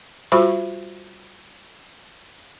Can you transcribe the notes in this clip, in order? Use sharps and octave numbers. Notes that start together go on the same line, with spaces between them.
G3 F4 F#4 C5 B5 C#6